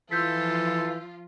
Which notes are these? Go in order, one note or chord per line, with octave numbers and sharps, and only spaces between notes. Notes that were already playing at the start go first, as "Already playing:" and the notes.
E3 F3 F4 A4 E6 G6 B6